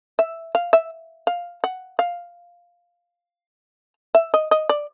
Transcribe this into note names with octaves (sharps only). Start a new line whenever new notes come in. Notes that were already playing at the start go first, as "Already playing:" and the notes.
E5
F5
E5
F5
F#5
F5
E5
D#5
D#5
D5